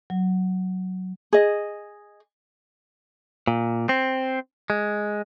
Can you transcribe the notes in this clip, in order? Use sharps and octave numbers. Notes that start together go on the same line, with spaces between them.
F#3
G#4 D#5
A#2
C4
G#3